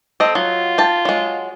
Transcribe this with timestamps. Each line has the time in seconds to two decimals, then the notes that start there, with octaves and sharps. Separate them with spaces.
0.20 C4 A4 D#5
0.35 F#3 F4
0.78 G5 A5
1.05 F#3 G#3